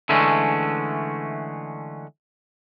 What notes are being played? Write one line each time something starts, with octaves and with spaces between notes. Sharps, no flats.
D3 E3 G#3 A3 C#4